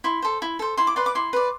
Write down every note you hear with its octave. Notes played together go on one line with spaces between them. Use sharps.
E4 C6
A4 C5
E4
A4 C5
E4 C6
D6
B4 D5 C6
D6
E4 C6
B4 D5